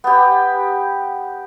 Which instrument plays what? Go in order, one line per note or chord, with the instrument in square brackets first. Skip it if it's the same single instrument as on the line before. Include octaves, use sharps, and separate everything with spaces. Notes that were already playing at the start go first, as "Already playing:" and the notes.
[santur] B3 G4